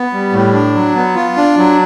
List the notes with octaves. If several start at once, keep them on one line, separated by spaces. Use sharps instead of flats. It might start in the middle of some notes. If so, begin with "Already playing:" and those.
Already playing: B3
G3
A2
D4
F#3
B3
F4
D4
F#3